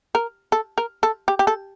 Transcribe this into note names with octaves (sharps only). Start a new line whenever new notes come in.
A#4
A4
A#4
A4
G4
G4
A4